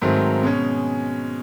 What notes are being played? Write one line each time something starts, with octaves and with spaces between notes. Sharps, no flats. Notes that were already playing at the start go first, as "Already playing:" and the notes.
G#2 D#3 F#3 A3 C4
B2 G#3 C#4